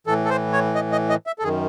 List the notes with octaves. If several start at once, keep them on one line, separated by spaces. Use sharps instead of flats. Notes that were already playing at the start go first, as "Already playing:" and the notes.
A2 E3 A4
A4
C5
C#5
D#5
D#5
D#5
E5
A4
F#2 D#3 G#4